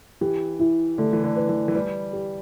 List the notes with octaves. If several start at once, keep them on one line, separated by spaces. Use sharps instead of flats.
E3 G4
E4
D3 A3
E3
D3
B4
E3
E3
G3 B4
G4